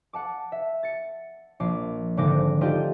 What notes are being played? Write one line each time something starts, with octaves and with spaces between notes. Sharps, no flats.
F#5 A5 D6
E5
A6 C#7
A#1 D6 C7
G#1 D3 C5 D6 A#6
A3 D#4 F4 G4 D5